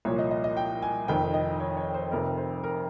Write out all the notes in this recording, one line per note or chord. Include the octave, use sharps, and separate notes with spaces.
C2 A#2 F3 C#5
D#5
D#5
D#5
G5
G#5
F1 F2 D#3 G5
D#5
C#5
C#5
C5
F1 F2 C3 A#4
C5
A#4